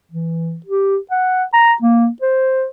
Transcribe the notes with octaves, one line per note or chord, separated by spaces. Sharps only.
E3
G4
F#5
A#5
A#3
C5